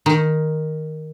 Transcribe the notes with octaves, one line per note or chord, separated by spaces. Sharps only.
D#3